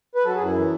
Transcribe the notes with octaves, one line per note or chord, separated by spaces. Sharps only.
B4
F#3 A4
G#4
F#2 E4
E3